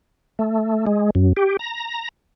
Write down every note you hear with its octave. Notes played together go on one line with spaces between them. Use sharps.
A3
G#3
F#2
G4
A#5